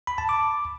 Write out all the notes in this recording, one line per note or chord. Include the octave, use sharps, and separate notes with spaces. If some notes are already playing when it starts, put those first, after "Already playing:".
B5
A5
D6